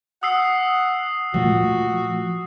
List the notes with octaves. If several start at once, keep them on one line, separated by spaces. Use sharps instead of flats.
F#5 D#6 E6 C7
A#2 F3 A3 F#4